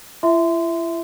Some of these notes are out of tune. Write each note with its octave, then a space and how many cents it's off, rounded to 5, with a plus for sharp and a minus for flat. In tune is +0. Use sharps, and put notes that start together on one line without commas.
E4 +40 E5 +0 C6 -25